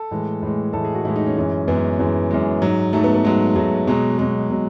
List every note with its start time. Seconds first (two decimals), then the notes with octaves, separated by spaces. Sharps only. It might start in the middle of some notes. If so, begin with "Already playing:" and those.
Already playing: A4
0.11 A2 E3 G#3
0.43 A2 E3 G#3
0.73 A2 E3 G#3 A4
0.85 G#4
0.95 F#4
1.05 A2 E3 G#3 E4
1.16 D#4
1.26 C#4
1.36 F#2 E3 G#3
1.68 F#2 E3 G#3 B3
1.99 F#2 E3 G#3
2.31 F#2 E3 G#3
2.62 G#2 F#3
2.93 G#2 F#3 A3
3.04 B3
3.14 B3
3.24 G#2 F#3 G#3
3.56 G#2 F#3 A3
3.87 B2 F#3 G#3
4.18 B2 F#3 G#3
4.50 B2 F#3